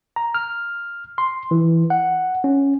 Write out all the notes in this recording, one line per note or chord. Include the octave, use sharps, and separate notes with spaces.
A#5
F6
C6
E3
F#5
C#4